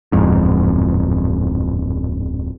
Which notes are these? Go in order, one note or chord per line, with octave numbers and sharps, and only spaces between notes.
D1 F2 G#2